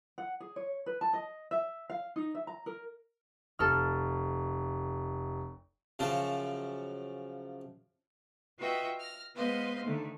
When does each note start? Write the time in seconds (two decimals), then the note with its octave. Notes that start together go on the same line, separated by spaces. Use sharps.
0.18 F#5
0.40 G#4
0.56 C#5
0.86 B4
1.01 A5
1.13 D#5
1.51 E5
1.90 F5
2.16 D#4
2.35 E5
2.47 A#5
2.66 A#4
3.59 F1 A4 F6
5.99 F#2 C#3 F3 C#4
8.59 F4 F#4 B4 D#5 E5 G5
8.99 F6 A#6
9.34 G#3 B3 B4 C5 D#5 F5
9.84 D3 D#3 A3